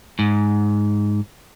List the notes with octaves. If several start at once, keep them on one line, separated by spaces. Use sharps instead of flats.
G#2